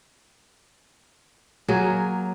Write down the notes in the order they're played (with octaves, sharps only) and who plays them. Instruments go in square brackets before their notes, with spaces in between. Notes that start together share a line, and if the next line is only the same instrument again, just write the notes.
[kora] F#3 A#3 G#4